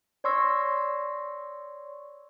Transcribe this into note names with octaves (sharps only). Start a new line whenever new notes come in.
C#5 D5 C6 C#6 E6 A#6